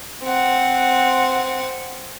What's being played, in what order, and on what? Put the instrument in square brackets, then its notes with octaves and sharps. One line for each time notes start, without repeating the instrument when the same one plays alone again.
[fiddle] C4 F#5